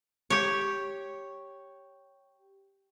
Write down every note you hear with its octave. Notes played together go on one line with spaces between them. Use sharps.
G4 C#5